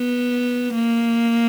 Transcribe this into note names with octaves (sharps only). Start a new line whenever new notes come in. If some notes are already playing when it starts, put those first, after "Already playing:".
Already playing: B3
A#3